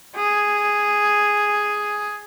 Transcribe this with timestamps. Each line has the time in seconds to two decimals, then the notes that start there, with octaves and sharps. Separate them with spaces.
0.16 G#4